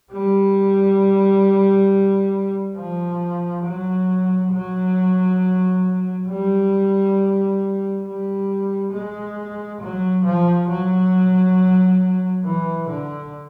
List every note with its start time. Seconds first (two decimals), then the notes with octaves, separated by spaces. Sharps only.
0.12 G3
2.76 F3
3.64 F#3
4.52 F#3
6.28 G3
8.04 G3
8.92 G#3
9.81 F#3
10.25 F3
10.69 F#3
12.45 E3
12.89 D3